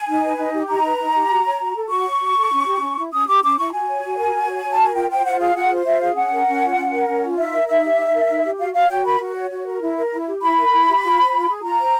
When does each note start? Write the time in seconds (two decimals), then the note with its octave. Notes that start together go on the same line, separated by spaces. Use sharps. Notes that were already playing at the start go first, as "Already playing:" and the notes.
Already playing: G#5
0.09 D#4
0.24 B4
0.39 D#4
0.54 G4
0.69 D#4 A#5
0.85 B4
1.00 D#4
1.15 G4
1.30 F#4
1.45 C#5
1.61 F#4
1.76 A4
1.91 F#4 C#6
2.06 C#5
2.21 F#4
2.37 A4
2.52 C#4
2.67 G4
2.82 C#4
2.97 E4
3.12 C#4 D#6
3.27 G4 D6
3.43 C#4 D6
3.58 E4 C#6
3.73 F#4 G#5
3.88 C#5
4.03 F#4
4.18 A#4
4.34 F#4
4.49 C#5
4.64 F#4
4.71 A5
4.79 A#4 G#5
4.94 F4 G5
5.09 C5 G5
5.25 F4 F#5
5.40 G#4 F5
5.55 F4 F#5
5.71 C5
5.86 F4 E5
6.01 G#4 F5
6.16 C#4 F#5
6.32 A#4
6.47 C#4
6.62 F4
6.76 C#4
6.92 A#4
7.08 C#4
7.23 F4
7.37 D#4 E5
7.53 A#4
7.68 D#4 E5
7.83 G4
7.98 D#4
8.14 A#4
8.28 D#4
8.44 G4
8.59 F#4 F5
8.74 C#5 F5
8.89 F#4 G5
9.05 A#4 B5
9.20 F#4
9.36 C#5
9.50 F#4
9.66 A#4
9.81 E4
9.96 A#4
10.11 E4
10.26 G4
10.41 E4 B5
10.57 A#4
10.72 E4
10.87 G4
11.02 F4
11.17 C5
11.33 F4
11.48 G#4
11.63 F4 A#5
11.78 C5